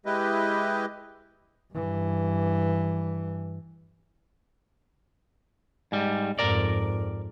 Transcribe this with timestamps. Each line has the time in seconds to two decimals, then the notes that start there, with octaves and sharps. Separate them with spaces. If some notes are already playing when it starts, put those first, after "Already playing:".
0.06 G#3 E4 G4 B4 D#5
1.74 G2 E3
5.92 G#2 G3
6.39 F2 G#2 A#4 D5